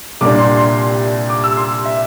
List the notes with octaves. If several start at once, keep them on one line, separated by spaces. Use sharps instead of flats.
C2 A#2 G3 D4 D6
C6
C6
D6
E6
C6
E5